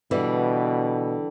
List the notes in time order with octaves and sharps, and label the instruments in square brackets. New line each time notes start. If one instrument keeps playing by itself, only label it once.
[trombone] B2 [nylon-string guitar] D3 E3 G3